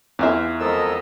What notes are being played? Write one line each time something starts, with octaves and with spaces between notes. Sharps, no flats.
E2 E3 F4 E5
F2 G#3 A4 A#4 D#5 E6